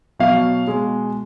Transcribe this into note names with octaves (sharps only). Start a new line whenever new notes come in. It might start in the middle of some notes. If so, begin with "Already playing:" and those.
B2 F#3 F5
B2 G#3